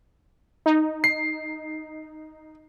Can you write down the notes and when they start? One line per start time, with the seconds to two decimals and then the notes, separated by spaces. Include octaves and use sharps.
0.66 D#4
1.04 C7